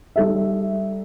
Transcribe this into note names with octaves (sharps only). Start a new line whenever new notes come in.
G3 D#4 A4 E5